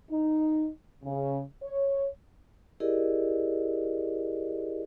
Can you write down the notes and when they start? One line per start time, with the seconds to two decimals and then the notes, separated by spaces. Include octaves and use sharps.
0.11 D#4
1.04 C#3
1.63 C#5
2.80 E4 G4 G#4 A#4 D5 D#5